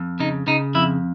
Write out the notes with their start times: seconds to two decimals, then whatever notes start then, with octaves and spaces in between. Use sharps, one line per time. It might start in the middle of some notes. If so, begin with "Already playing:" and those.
Already playing: F2
0.20 C#3 D#4
0.47 C#3 D#4
0.75 F2 E4